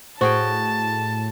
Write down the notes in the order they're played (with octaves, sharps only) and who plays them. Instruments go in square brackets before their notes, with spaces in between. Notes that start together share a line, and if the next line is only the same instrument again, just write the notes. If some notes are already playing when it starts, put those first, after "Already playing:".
[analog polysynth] A2 [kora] F#4 G#4 G5 [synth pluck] C5 [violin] A5